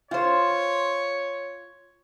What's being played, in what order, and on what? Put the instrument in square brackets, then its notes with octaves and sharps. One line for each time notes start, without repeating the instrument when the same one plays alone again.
[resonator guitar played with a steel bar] F4 C5 [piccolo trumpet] C#5